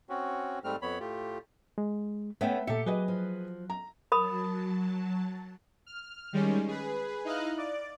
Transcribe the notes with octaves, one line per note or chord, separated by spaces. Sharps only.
C4 C#4 F#4
G#2 G3 A3 C4 F6
F2 B3 C#5 B5
A2 A3 F4 G4
G#3
A3 B3 C#4 B4 E5 G5
A#2 G4 A4 E5 C#7
F#3 G#4 B4 D#5
F3
A#5
F#3 A#4 A5 B5 D#6
F6
D#3 G3 G#3 C#4
G#4 B4
D#4 E4 D#5 F5 F#6
D5